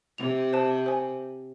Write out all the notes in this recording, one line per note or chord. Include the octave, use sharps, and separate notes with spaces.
C3 F7
C5 A5
C5 G#5